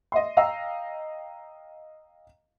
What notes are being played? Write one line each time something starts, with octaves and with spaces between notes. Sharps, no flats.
D#5 E5 C6
D#5 F5 G5 A#5 E6